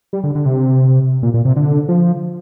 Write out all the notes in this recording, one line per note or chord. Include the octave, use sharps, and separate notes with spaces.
G3
D3
D3
C3
A#2
A#2
C3
D3
F3